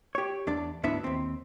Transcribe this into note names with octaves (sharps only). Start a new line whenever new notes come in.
G4 C#5
E2 D4 D5
D2 G#2 B3 D4 E4 E5
D#2 C4